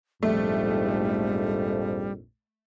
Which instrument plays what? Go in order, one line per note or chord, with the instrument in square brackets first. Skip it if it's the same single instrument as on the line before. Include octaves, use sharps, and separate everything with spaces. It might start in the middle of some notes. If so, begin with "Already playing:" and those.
[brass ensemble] A#1 F2 G#2 [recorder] G3 [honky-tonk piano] A3